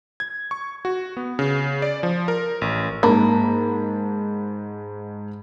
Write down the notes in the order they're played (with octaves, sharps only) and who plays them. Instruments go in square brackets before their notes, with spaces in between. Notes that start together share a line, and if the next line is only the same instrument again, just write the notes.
[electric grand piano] G#6
C#6
F#4
B3
C#3
D5
F3
A#4
A1
[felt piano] G#2 A5 B5 [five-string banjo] A#3